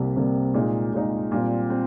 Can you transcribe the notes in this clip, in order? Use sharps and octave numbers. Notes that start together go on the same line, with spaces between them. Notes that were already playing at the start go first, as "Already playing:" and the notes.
Already playing: C2 C3 G3 A#3
C2 C3 G3 A#3
A#2 G#3 D#4
A#2 G#3 D#4
A#2 G3 C4
C4